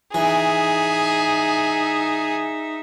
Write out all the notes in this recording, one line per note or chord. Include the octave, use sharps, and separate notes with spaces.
E3 D#4 G#4 E5